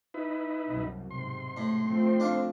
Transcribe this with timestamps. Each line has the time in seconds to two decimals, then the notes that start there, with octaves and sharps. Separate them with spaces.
0.14 D#4 E4 B4
0.69 C2 F#2 B2
1.11 G#2 C3 C6
1.57 A2
1.88 F3 A3 C4
2.20 D4 F5